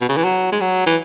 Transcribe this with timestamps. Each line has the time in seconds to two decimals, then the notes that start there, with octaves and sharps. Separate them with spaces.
0.01 B2
0.09 C#3
0.17 E3
0.24 F#3
0.52 G#3
0.61 F#3
0.86 E3